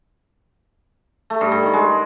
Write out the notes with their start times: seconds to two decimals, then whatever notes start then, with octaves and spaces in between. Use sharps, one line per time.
1.30 A3
1.41 G2
1.52 G2
1.63 D#3
1.73 G#3